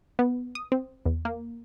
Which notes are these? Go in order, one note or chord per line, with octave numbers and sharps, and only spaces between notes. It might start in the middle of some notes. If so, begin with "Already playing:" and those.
B3
D#6
C4
E2
A#3